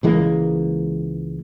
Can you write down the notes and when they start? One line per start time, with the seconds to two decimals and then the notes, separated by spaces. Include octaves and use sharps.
0.03 C#2 E3 G#3 A#3